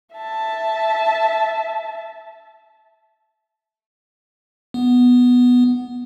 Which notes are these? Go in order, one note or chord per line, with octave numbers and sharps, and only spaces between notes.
E5 A5
B3